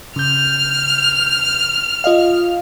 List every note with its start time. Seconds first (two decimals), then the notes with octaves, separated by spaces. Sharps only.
0.16 C#3 F6 G6
2.04 F4 D#5 F5